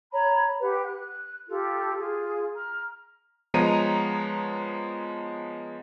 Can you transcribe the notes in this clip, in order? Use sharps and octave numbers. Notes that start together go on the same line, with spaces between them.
C#5 A#5 B5
G4 B4 F#5
F#6
F4 G4 A4
F4 G#4
A#5 F6
F3 G#3 B3 C#5 A#5 D#7